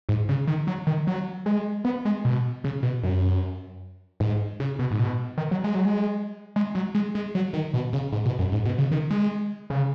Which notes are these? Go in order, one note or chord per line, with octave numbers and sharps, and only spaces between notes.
G#2
C#3
D#3
F#3
D#3
F#3
G#3
B3
G#3
B2
C#3
B2
F#2
G#2
C#3
B2
G#2
B2
D#3
F#3
G#3
F#3
G#3
G#3
F#3
G#3
G#3
F#3
D#3
B2
C#3
G#2
B2
F#2
G#2
B2
C#3
D#3
G#3
C#3